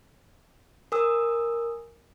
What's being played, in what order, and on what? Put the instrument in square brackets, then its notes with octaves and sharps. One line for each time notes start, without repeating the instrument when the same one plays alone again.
[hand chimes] A#4 G#5 D#6 E6